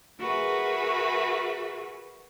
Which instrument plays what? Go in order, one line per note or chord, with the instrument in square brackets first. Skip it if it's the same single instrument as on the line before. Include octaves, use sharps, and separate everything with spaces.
[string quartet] F#4 G#4 A#4 B4 E5